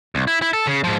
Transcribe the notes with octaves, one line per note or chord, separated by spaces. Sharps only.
C2
E4
E4
A4
C#3
G#2 F3